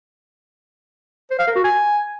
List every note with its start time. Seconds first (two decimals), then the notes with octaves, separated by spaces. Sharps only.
1.31 C5
1.39 F5
1.48 A#4
1.56 F#4
1.64 G#5